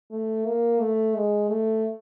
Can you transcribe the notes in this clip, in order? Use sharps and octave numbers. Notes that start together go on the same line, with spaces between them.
A3
A#3
A3
G#3
A3